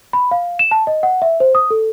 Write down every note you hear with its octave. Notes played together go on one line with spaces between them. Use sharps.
B5
F5
E7
A5
D#5
F#5
E5
C5
D#6
A4